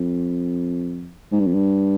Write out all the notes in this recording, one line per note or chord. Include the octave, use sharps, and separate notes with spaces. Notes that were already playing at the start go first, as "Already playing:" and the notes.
Already playing: F2
G#2
G2
F2
G2